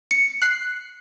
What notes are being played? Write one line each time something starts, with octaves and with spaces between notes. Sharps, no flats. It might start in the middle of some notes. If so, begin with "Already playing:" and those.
C#7
F#6 C7